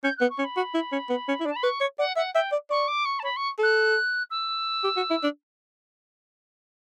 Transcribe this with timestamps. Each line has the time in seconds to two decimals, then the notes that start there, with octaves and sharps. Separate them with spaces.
0.03 C#4 G6
0.17 B3 F#6
0.30 C#6
0.39 C#4
0.44 B5
0.57 F#4
0.74 E4
0.92 C#4
1.10 B3
1.28 C#4
1.40 E4
1.46 D4
1.49 A5
1.56 B5
1.63 B4 C#6
1.81 C#5
1.98 D5 F#5
2.16 E5 F#5
2.34 E5 G5
2.52 D5
2.70 D5 C#6
2.88 D6
3.05 C#6
3.19 A5
3.23 C#5 B5
3.36 C#6
3.59 A4 F#6
4.30 E6
4.84 G4
4.97 F#4
5.10 E4
5.24 D4